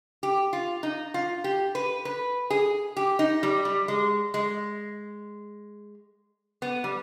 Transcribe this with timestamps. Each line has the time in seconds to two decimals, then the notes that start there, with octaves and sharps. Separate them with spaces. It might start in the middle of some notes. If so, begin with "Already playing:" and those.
0.23 G4
0.53 F4
0.83 D#4
1.14 F4
1.44 G4
1.75 B4
2.05 B4
2.50 G#4
2.97 G4
3.19 D#4
3.43 G3
3.65 G3
3.88 G#3
4.34 G#3
6.62 B3
6.84 G3